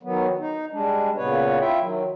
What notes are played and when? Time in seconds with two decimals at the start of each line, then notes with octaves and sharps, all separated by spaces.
0.03 D#3 F#3 B3
0.39 D#4
0.72 G3 G#3 D4
1.16 A#2 C#3 B3 B4 C#5
1.60 E4 F4 E5 G5
1.80 D#3 F#3